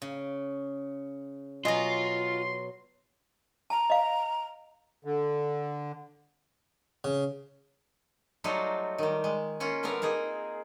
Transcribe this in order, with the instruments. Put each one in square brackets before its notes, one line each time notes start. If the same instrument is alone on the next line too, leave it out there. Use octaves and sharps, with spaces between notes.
[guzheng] C#3
[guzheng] B2 F#3 [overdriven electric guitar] F4 [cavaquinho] D#5 G#5 D#6 [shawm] C6
[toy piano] A5 [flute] A#5
[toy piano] D#5 F5
[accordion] D3
[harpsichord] C#3
[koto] F#3 G3 A3 D#4 F4 F#4
D#3 G3
G#3
A#3 C#4 F4
D3 G3 B3 C4 A#4 A#5
A#3 D#4 G#4